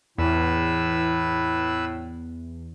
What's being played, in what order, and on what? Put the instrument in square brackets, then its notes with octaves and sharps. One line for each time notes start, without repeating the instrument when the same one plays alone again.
[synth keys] E2 [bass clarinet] A2 [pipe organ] B4 E6